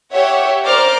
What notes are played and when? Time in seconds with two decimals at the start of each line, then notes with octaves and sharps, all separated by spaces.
0.11 G4 C#5 E5 F#5
0.64 A#4 C5 D5 A#5 D6 F6